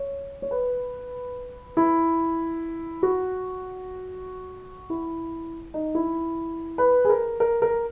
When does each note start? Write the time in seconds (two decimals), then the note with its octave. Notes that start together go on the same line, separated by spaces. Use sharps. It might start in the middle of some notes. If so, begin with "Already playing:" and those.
Already playing: C#5
0.42 C#5
0.51 B4
1.77 E4
3.03 F#4
4.90 E4
5.74 D#4
5.95 E4
6.78 B4
7.05 G#4
7.10 A#4
7.40 A#4
7.62 A#4